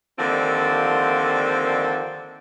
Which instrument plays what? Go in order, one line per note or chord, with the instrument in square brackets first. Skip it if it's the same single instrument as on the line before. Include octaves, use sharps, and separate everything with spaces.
[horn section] D3 D#3 F3 G3 A#3 C4